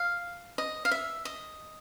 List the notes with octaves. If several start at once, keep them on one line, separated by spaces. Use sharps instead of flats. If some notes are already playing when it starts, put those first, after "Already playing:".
Already playing: F5
D#5
F5
E5
D#5